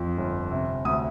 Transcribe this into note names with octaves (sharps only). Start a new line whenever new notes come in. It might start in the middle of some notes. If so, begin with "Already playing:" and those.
Already playing: F2 F3
G1
C3
D2 D#6